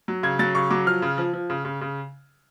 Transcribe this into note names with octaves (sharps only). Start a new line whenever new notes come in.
F#3
C#3 G#6
F#3 A6
C#3 C#6
F#3 D6
F3 F6
C#3
F3
F3
C#3
C#3
C#3